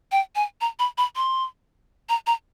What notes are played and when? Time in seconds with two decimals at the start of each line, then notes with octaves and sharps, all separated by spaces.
0.12 G5
0.35 G#5
0.61 A#5
0.79 B5
0.98 B5
1.16 C6
2.09 A#5
2.27 A#5